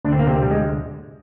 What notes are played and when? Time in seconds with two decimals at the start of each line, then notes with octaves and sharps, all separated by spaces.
0.04 D2 D4
0.08 D3 C4
0.19 A#3
0.27 C3 C4
0.42 G3
0.51 G#3